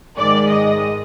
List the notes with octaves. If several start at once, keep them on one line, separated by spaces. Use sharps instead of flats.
G#2 D#3 G#3 D5
D#5